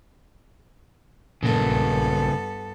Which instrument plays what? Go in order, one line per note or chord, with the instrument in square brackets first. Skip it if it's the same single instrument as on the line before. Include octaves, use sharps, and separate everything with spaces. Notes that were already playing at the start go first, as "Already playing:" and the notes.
[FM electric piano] A#1 [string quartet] G2 B3 A4 [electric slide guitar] C#3 A#3